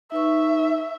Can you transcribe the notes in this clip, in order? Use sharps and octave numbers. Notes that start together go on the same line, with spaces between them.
D#4 B4 E5 C#6